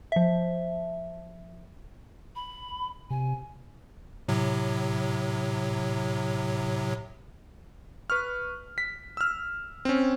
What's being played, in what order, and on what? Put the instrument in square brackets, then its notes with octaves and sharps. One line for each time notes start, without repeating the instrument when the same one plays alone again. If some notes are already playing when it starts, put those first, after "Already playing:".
[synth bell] F3 E5
[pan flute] B5
[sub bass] C3 [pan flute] G#5
[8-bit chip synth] A2 C3 F#3
[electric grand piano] B4 C#6 F6
B6
E6 F6
C4 C#4